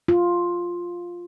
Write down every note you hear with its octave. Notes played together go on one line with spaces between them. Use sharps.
F4